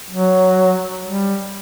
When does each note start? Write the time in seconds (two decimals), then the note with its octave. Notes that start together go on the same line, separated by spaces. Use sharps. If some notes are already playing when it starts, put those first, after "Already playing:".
0.10 F#3
1.04 G3